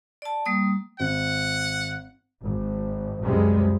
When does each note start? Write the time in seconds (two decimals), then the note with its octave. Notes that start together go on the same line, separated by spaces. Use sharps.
0.22 D5 A5
0.46 G3 A#3 D#6
1.00 G#1 F#5
2.40 G#1
3.22 C#2 F#2 C3 G3 G#3